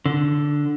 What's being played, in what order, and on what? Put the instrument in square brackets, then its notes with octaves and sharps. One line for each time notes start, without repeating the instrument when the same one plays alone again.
[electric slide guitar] D3